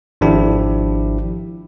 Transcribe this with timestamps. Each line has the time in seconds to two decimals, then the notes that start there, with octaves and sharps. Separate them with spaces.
0.21 G#1 F3 D4 E4 G4